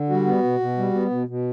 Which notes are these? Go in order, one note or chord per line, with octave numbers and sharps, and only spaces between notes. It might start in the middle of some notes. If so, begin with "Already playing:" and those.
Already playing: D3
G3 F#4
B3
B2
B2
G3
B3
B2
B2